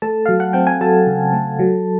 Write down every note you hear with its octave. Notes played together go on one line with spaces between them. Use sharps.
A3 A4 A5
F#3 F5
F#5
C4 G5
G#5
F#3 A4 A5
C#3
A3
F#3